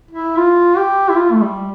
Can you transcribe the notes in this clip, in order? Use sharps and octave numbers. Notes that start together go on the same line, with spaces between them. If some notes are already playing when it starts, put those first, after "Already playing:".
E4
F4
G4
E4
F4
A3
G3